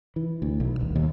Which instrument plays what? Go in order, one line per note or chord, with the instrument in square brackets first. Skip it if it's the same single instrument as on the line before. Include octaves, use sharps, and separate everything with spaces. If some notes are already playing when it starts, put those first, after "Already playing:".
[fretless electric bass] E3
D2
B1
D#1
D#2